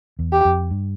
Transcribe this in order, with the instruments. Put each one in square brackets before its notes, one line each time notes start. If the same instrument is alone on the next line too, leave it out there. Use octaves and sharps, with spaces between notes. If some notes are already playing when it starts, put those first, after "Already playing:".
[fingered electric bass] E2
[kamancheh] G4
[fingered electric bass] F2
G2